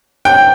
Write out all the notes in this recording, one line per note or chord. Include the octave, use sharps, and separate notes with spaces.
G5